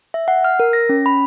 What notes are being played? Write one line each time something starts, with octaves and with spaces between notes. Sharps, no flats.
E5
F#5
F6
A#4
A#6
C#4
B5